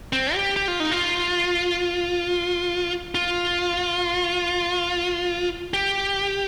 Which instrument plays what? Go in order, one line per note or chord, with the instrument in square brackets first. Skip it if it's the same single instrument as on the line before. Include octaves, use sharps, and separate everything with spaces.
[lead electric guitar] C4
G4
G4
F4
D#4
F4
F4
G4